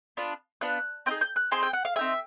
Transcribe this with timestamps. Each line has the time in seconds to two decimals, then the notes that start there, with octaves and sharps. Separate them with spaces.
0.17 B3 D4 F4
0.61 B3 D4 F4 F#6
1.06 C4 D#4 G#4 G6
1.21 G6
1.36 F#6
1.51 C4 D#4 G#4 C6
1.63 G5
1.73 F#5
1.85 F5
1.96 C4 D#4 G#4 E5